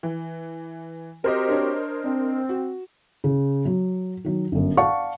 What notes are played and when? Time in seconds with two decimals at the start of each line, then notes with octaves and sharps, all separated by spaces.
0.03 E3
1.24 C4 F#4 G4 A#4 C5 D#5
1.49 D4 C#5
2.04 C4 D4
2.49 F#4
3.24 C#3
3.65 F#3
4.25 D#3 F#3
4.52 G1 F#2
4.77 D5 F5 F#5 A5 C#6